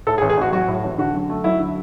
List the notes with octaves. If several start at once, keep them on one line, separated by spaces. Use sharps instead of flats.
A2 A4
G#4
A1
G#4
A1 F#4
F#3 F#4
A2
A1
D3 F#4
F#2
A3
F#3 E4
D3